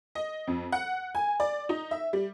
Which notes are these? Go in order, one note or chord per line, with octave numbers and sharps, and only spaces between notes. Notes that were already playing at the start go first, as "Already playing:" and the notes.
D#5
F2
F#5
G#5
D5
D#4
E5
G3